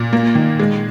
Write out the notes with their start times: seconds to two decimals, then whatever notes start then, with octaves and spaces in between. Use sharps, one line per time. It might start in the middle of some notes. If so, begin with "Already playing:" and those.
Already playing: A#2
0.13 A#3
0.35 D#3
0.59 G#3